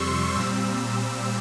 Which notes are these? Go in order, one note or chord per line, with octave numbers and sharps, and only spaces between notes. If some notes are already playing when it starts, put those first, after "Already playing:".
Already playing: F2 C3 G3 C6 C#6 E6
A#2 G3 C4 E6